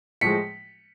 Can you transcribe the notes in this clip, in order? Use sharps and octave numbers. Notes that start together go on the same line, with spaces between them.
A2 F3 G#3 B6 C#7